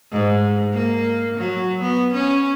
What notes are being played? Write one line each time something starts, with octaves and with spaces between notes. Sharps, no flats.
G#2
A#3
F#3
B3
C#4